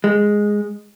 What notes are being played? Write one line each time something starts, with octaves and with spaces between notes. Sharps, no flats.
G#3